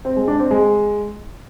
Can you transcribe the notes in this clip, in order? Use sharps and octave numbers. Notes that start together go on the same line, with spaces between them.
C4
G#3
D4
C4
G#3